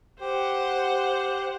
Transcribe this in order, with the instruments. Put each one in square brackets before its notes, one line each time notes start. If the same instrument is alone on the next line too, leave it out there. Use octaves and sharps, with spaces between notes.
[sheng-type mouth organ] G4 [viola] C5 F#5